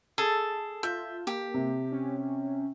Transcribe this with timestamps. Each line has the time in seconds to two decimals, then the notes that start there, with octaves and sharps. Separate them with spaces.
0.18 G#4 A4
0.83 F4 E5 G6
1.27 A#3 G4
1.54 C3
1.92 C#4